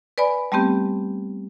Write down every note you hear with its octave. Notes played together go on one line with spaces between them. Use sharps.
B4 D5 G#5 B5
G3 A3 B3 C4 G4